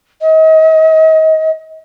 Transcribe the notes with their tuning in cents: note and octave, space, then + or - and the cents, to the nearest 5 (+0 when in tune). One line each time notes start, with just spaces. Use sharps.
D#5 +35